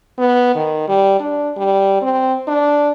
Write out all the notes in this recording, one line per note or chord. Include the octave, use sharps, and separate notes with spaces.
B3
D#3
G3
D4
G3
C4
D4